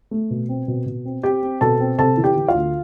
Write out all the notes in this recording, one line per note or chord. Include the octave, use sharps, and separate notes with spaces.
A3
B2
C4
B2
B2
C4
C4 G4 G5
C4
B2 A4 A5
C4
C3 A4 A5
E3
G4 G5
E3
F4 F5
D2